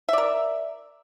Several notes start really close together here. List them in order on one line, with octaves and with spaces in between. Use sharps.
E5 D5 A#4